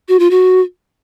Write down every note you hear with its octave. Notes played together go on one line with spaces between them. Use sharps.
F#4
F4
F#4